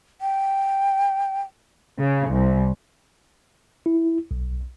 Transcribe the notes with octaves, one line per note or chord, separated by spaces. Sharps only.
G5
C#3
C2
E4
B1